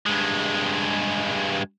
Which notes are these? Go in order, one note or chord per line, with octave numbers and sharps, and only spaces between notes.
G2 G#3